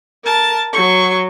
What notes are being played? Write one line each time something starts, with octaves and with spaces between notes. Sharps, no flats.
A#4 A5
F#3 C#6